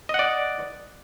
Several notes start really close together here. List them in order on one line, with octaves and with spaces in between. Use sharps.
D#5 F#5 D5